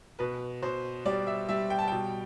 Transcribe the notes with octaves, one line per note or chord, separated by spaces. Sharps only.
B2 B4
B2 C5
G3 D5
E5
G3 E5
G5
A5
B2 G5